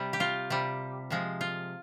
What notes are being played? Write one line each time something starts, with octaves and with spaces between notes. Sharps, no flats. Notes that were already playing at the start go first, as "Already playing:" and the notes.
Already playing: C3 G3
G4
F4
C3 G3
C3 F3 G#3
F4